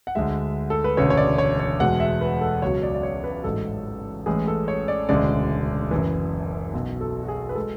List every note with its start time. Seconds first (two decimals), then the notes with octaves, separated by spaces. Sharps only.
0.07 F#5
0.15 D2 D3 G#3 E5
0.70 A4
0.84 B4
0.97 E1 D2 C#3 E3 C#5
1.10 C#5
1.17 D5
1.38 C#5
1.60 C#5
1.80 E1 E2 B2 G#3 F#5
2.00 E5
2.21 B4
2.41 A4
2.62 C#2 B2 F#3 C#5
2.83 D5
2.94 D5
3.03 C#5
3.24 B4
3.44 A1 G#2 F#3 A4
4.26 A1 A2 E3 G#3 G#4
4.47 A4
4.68 C#5
4.88 D5
5.09 E1 D2 C#3 G#3 D5
5.91 F#1 F#2 E3
6.73 B1 B2 F#3
7.01 A4
7.23 F#4
7.28 G#4
7.49 B4
7.55 G#3 A4